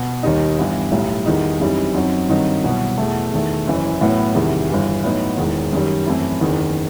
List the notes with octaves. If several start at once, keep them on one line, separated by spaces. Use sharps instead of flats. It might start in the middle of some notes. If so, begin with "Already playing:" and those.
Already playing: B2
D#2 D#3 G3 D#4
G1 G2 E3 B3 E4
B1 A2 G3
E2 D#3 G3 D#4
F#2 E3 G3 C4 D#4
F#2 F#3 C4 D#4
G2 D#3 F#3 C4 D#4
C2 B2 F#3
E2 B2 A3
E2 D#3 A3
F#1 F#2 E3
A2 F#3 B3 E4
E2 C3 D#3 G3
G1 G2 E3
A2 F#3 B3 D#4
E1 E2 D#3
F#2 D#3 G3
F#2 E3 A3 C4 E4
F#1 E2 D#3